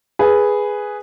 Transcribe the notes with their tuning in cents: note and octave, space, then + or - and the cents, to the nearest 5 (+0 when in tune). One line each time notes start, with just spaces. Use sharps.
G#4 +0 B4 +0